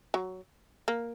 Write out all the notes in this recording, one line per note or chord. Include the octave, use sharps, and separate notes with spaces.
F#3
A#3